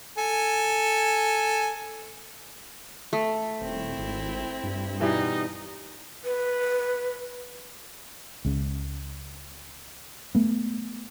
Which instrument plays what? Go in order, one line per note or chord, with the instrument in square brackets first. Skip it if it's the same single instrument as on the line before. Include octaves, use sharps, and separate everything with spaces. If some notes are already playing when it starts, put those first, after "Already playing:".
[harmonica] A4 G#5
[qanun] A3
[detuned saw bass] D#1 [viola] C4 E4
[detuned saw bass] G#1
G2
[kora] B2 E3 G3 [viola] D#4
[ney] B4
[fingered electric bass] C#2 C#3
A3 B3